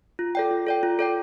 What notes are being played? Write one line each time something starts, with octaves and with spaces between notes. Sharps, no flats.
F4
A4 D5 G5
F4
A4 D5 G5
F4
A4 D5 G5